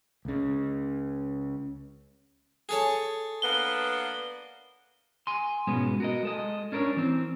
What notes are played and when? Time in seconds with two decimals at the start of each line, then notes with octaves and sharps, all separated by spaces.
0.25 C#2 C#3
2.69 G#4 A4 C#5
3.42 A#3 B3 D4 G7
5.27 G#5 C6
5.67 G#2 B2 G#3 B3 C#4
6.00 F#4 A#4 D#5
6.23 G#3 A4 D#5
6.72 C#4 D4 A#4 C5 C#5
6.96 E3 C4